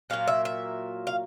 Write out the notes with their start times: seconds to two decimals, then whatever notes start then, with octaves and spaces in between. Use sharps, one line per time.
0.10 A#2 F#3 A#3 F5
0.28 E5
0.45 E5
1.07 F5